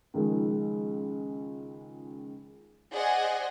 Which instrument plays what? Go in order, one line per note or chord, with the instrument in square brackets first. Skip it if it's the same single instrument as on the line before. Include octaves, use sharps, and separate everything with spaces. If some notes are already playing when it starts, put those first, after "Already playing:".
[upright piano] C#2 D#3 F3 G#3
[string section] G#4 C5 D5 D#5 F#5 G#5